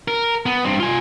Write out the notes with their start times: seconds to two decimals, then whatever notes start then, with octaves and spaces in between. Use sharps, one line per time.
0.08 A#4
0.46 B3
0.65 G2 C4
0.80 F4 G#5